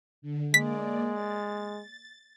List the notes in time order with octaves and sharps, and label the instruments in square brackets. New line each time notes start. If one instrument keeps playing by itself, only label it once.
[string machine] D3
[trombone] G#3 [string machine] A#3 D5 [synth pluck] B6
[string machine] A6